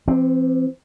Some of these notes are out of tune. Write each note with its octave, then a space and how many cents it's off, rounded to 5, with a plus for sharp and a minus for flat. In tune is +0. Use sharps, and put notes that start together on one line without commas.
E3 +45 C4 +0